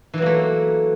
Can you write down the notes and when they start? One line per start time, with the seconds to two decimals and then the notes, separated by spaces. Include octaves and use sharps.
0.14 E3
0.18 F#3
0.22 A#3
0.26 A3